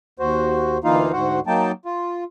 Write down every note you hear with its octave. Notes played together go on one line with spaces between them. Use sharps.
D#2 F#4 C5
D2 E3 A#3 D#4 F4 F5
D2 G#2 F#4 C5 F#5
F#3 A#3 D#4 G5 A5
F4